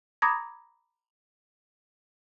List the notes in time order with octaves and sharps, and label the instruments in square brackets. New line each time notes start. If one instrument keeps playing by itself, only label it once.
[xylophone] A#5 B5 D6 D#6 G#6 A#6